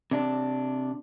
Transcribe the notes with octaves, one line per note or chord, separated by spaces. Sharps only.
C3 D4